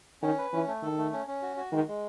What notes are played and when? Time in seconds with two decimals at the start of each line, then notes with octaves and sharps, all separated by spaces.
0.22 D#3 C#4
0.38 B4
0.53 E3 C#4
0.67 A3
0.83 D#3 A4
0.97 A3
1.13 C#4
1.28 C#4
1.42 F#4
1.57 F#4
1.72 D#3 G#3
1.87 G#3